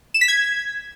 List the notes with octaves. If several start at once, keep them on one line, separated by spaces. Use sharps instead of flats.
E7
B6
G#6